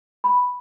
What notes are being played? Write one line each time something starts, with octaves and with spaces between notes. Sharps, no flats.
B5